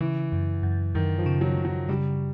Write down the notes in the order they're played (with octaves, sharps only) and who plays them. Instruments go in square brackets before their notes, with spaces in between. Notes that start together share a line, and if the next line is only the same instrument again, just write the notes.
[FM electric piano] C#3 [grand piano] E3
[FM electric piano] F#2
F#2
[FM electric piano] F#2 [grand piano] D#3
[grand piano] F3
[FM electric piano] C#3
[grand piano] F#3
[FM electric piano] C#3
[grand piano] F#3
[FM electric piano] C#3 [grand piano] G3